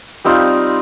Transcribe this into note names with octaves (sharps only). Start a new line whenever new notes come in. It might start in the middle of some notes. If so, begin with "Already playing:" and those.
G3 C4 D#4 F4